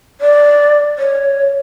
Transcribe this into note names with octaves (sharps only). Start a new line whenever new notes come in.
D5
C#5